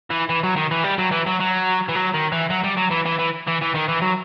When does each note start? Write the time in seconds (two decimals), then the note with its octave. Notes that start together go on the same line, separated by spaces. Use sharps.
0.10 E3
0.29 E3
0.43 F#3
0.56 D#3
0.71 E3
0.84 G3
0.98 F#3
1.12 E3
1.26 F#3
1.40 F#3
1.88 E3
1.95 F#3
2.14 D#3
2.32 E3
2.50 F#3
2.64 G3
2.77 F#3
2.91 E3
3.06 E3
3.19 E3
3.47 E3
3.61 E3
3.74 D#3
3.88 E3
4.02 F#3